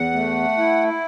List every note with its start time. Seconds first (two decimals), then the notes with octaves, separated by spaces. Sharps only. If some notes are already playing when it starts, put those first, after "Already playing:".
Already playing: E2 F#5
0.14 A3
0.57 E4